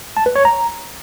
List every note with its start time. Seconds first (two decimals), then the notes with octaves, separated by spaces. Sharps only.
0.17 A5
0.26 B4
0.36 C#5
0.45 A#5